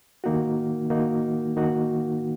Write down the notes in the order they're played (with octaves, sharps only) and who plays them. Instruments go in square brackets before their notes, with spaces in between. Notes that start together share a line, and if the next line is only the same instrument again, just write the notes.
[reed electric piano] D#3 A#3 D#4 F#4
D#3 A#3 D#4 F#4
D#3 A#3 D#4 F#4